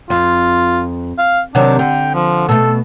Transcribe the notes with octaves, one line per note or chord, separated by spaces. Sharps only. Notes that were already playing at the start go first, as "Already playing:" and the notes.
F2 F4
F5
C3 D#3 F#3 D4
D3 G5
F3
B2 A3 A4